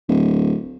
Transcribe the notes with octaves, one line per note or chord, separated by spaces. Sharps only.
D1